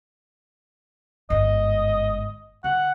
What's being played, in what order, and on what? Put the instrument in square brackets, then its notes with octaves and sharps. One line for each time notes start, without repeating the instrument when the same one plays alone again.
[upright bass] G1 G#2 [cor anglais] D#5
[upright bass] D3 [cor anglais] F#5